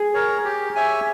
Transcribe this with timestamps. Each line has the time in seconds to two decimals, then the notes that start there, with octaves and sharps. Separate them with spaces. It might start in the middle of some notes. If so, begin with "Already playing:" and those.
Already playing: G#4
0.14 A#4 C#5
0.45 G4
0.75 C#5 E5 G#5